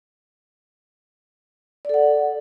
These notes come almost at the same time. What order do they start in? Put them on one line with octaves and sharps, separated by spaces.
D5 A4 F#5